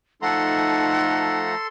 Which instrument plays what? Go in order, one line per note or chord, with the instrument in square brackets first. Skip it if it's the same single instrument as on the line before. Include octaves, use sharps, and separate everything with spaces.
[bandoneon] F3 A3 A#5 [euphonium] D#4 [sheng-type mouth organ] A4 C6 [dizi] F#5